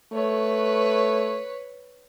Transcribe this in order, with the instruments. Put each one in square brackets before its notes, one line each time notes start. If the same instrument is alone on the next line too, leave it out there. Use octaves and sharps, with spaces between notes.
[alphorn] A3 [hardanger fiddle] B4 C#5